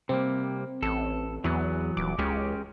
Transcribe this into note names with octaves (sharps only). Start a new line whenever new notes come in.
C3 G3 A#3 C4
A1 A4
E2 E3 F#3 B3
D#1 D6
C#2 G#3 C#4 G4